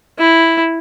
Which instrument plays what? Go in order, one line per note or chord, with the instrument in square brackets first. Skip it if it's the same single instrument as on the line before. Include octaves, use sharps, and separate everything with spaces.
[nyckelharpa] E4